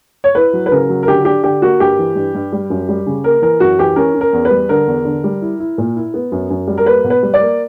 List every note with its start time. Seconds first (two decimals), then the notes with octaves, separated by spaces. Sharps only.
0.24 C#5
0.35 E4 B4
0.53 F#3
0.66 B4
0.71 C#3 A#4
0.89 F#3
1.03 A#4
1.08 D3 G4
1.25 D4 G4
1.44 D3 G4
1.62 A#3 F#4
1.80 G2 G4
1.98 E3
2.16 G2
2.35 G2
2.52 G3
2.70 F#2
2.89 G3
3.06 C#3
3.24 A#3 A#4
3.42 E3 A#4
3.60 F#2 F#4
3.79 E3 G4
3.96 C#4 A#4
4.15 C#4
4.21 A#4
4.33 E2
4.45 B4
4.51 G3
4.69 D3 A#4
4.87 E2
5.05 D3
5.24 G3
5.41 E4
5.60 E4
5.78 A#2
5.96 E4
6.14 B3
6.32 F#2
6.50 F#2
6.67 G3
6.78 A#4
6.86 A#3 B4
7.04 B2
7.10 B4
7.23 G3
7.34 D5
7.40 A#3